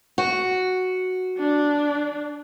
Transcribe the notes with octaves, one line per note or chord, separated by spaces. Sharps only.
F#4
D4